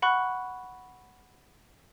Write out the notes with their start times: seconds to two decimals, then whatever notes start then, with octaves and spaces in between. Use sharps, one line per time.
0.02 F#5 B5 C#6 F#6